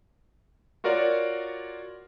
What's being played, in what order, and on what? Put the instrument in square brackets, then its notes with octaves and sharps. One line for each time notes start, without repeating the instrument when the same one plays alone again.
[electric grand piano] F4 F#4 A#4 C#5 D5